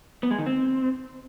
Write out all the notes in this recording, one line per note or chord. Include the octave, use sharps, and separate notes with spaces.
B3
G#3
D#3
C4